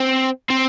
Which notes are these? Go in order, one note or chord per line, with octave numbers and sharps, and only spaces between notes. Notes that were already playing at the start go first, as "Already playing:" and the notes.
Already playing: C4
C4